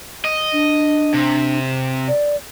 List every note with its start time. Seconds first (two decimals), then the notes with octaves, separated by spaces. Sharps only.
0.25 D#5
0.52 D4
1.14 C3
2.08 D5